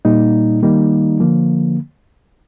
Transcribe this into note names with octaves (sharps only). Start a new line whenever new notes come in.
A#2 G3 A#3 D#4
D#3 G3 A#3 D#4
D3 F3 A#3